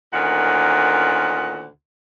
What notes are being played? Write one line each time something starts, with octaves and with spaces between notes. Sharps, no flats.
D2 A#2 D#3 C#4 F#5